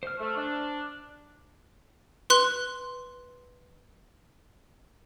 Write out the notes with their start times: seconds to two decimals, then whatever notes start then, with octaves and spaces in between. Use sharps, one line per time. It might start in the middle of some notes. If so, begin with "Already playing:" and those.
0.03 C5 F6
0.19 A3
0.36 D4
2.30 B4 C6 F#6